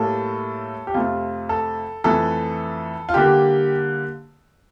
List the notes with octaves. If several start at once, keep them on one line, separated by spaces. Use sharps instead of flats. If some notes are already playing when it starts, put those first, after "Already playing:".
Already playing: A2 G3 A#3 A4
G4
F2 C3 F3 A3 F4
A4
F2 E3 A3 A4
F4
D3 G3 A#3 G4